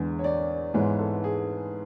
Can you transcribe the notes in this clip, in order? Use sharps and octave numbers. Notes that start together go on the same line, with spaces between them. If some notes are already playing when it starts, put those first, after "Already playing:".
Already playing: E2 D3 G#3
C#5
D5
G#2 E3 G#3 B3 C#5
A4
G#4